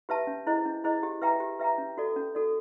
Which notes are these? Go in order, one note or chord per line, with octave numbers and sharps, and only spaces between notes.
G4 B4 E5 A5
C#4
E4 G#4 C5 D#5
C#4
E4 G#4 C5 D#5
G4
B4 E5 G5 A#5
G4
B4 E5 G5 A#5
C#4
F#4 A4 D5
C#4
F#4 A4 D5